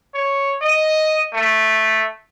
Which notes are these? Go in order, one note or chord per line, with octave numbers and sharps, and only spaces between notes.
C#5
D#5
A3